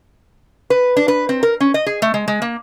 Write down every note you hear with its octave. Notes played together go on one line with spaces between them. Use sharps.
B4
D4
B4
C4
A#4
C#4
D#5
G#4
A3
G#3
G#3
A#3